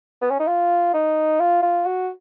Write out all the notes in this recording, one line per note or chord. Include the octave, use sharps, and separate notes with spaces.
B3
C#4
D#4
F4
D#4
F4
F4
F#4